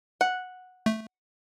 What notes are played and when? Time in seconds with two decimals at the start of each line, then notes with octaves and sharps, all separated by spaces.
0.21 F#5
0.86 A3